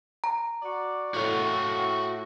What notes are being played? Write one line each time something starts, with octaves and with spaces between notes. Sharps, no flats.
A#5
F#4 D5
A2 F#4 F5